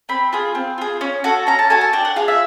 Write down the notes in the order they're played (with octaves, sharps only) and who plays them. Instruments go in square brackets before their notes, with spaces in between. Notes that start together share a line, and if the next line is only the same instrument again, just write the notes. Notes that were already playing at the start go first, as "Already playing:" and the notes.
[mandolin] C4 B5
F4 G#4
C4
F4 G#4
C#4
F#4 A4
C#4 A#5
A5
F#4 A4 G#5
A5
D4 G5
F#5
F4 G#4 F5
E5